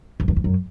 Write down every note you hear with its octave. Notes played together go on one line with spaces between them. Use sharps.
F2
E2
F2
F#2